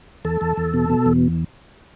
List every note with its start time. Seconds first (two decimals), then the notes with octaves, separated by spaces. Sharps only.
0.25 E2 A4
0.41 E2
0.57 E2
0.74 B2
0.90 B2
1.06 E2